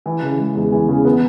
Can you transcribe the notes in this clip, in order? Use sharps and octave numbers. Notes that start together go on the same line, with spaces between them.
E3
C#3
G#3
E2
E3
C#3
B3